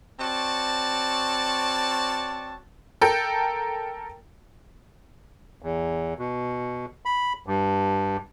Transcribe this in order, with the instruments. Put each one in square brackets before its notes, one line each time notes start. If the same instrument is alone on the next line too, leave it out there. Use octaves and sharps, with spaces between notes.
[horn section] C4 F#4 C#5 D5 A5
[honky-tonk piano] A4 A#4 G5
[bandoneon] E2
B2
B5
G2